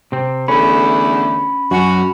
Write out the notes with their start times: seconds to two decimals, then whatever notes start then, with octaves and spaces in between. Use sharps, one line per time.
0.12 C3 C4
0.48 E2 D3 A3 C#4 B5
1.71 F#2 C#4 F#4